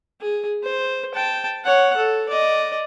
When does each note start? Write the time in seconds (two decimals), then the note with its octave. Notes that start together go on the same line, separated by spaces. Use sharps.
0.21 G#4
0.63 C5
1.15 G5 A5
1.64 C#5 F#5
1.97 A4
2.29 D5 D#5